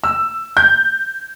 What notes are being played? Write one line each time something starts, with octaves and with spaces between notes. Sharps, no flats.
E6
G6